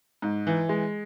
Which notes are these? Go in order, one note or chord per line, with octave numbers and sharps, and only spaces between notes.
G#2
E3
G#3